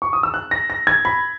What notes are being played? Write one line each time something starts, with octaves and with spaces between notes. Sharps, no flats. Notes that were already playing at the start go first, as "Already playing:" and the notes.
C#6
D#6
E6
F#6
A#6
A#6
G#6
B5